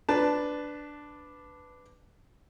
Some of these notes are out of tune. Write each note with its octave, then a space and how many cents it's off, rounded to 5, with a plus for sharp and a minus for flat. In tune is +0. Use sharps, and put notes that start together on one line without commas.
D4 +0 B4 +10 A5 +0